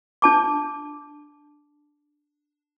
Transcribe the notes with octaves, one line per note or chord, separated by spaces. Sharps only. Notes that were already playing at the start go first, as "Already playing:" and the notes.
D4 A5 D6